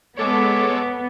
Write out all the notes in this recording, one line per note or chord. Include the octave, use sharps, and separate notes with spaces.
G#3 B3 A4 C#5 D6